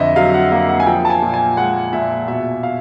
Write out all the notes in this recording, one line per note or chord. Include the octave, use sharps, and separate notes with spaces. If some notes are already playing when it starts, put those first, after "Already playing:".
Already playing: F2 D3 D#5 E5
F#3 F5
F#5
A#3 F5
F#5
G#5
F3 G5
A5
G#5
A#2
G#5
G#3 F#5
A#2 E5
B2 E5
F5